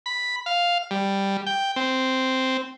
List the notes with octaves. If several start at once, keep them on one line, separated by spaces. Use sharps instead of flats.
B5
F5
G3
G5
C4